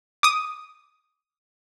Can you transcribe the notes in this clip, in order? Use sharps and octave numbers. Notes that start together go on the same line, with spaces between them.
D6 D#6